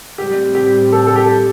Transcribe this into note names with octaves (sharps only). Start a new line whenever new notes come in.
A2 G3 C4 G4
G4
A4
A4
G4